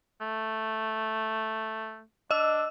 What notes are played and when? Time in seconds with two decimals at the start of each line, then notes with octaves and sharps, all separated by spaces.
0.21 A3
2.31 D4 D#5 E6